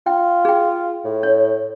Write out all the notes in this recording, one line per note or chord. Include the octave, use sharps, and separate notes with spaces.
F4 G5
G#4 G5
A2
C#5